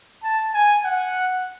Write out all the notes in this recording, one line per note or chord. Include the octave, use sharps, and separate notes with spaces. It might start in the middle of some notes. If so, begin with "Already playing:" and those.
A5
G#5
F#5